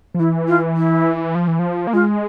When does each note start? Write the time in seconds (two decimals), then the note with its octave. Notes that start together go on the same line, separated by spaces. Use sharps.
0.14 F3
0.19 E3 E4
0.48 F4
0.77 E4
1.35 F3
1.48 E3
1.59 F3
1.87 A#3
1.93 G#3 F4